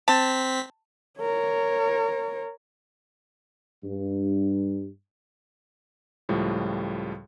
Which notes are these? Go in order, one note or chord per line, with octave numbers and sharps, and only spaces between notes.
C4 A5 B6
A#4 C#5
G2
C#2 A2 F3 G3